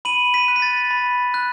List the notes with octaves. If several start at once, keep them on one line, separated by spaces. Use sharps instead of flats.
B5 D#7 F#7
B6 D#7
F#6
B6
A6
B5
F#6